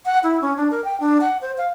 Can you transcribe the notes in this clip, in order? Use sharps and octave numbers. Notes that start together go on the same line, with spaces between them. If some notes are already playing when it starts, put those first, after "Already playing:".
F#5
E4
C#4
D4
A#4
G5
D4
F#5
C5
F5